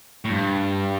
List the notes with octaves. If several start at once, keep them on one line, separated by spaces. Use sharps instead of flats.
A2
G2